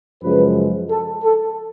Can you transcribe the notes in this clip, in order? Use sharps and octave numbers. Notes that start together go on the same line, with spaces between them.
F#2 C#3 F3 G#3 B4
A4
A4